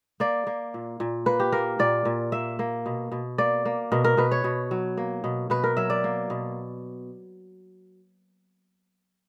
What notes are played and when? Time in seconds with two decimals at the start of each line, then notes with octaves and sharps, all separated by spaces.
0.20 A#3 D5
0.47 A#3
0.74 A#2
1.00 A#2
1.26 A#3 B4
1.40 G4
1.52 A#3 A#4
1.79 A#2 D5
2.05 A#2
2.32 A#3 E5
2.59 A#3
2.86 B2
3.12 B2
3.38 A#3 D5
3.65 A#3
3.92 B2 A#4
4.04 A#4
4.17 B2 B4
4.31 C#5
4.44 B2
4.71 F#3
4.97 A#3
5.24 B2
5.50 B2 B4
5.64 A#4
5.77 F#3 E5
5.90 D5
6.04 A#3
6.30 B2